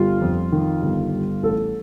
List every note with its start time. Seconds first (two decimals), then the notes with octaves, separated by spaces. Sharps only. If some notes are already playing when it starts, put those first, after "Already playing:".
Already playing: G1 G3 F4
0.22 F2
0.52 D#3
0.82 G1
1.13 G3
1.43 A1 A4